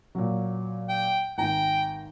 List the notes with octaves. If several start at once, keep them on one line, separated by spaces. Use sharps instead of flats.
A#2 F#3
G5
G#1 G5 G#5 A#5